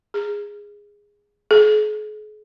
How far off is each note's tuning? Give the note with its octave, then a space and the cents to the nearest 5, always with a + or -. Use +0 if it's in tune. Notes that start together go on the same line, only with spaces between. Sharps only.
G#4 -10
G#4 +40